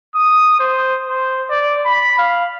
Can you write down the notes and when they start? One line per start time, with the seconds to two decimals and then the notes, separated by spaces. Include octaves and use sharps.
0.15 D#6
0.60 C5
1.09 C5
1.50 D5
1.85 B5
2.19 F5